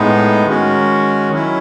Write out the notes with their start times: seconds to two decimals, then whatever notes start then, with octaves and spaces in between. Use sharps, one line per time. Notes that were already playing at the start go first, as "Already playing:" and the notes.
Already playing: A2 G#3 B3 D#4
0.47 D#3 G#3 C#4 F#4
1.32 D#3 F#3 C#4 E4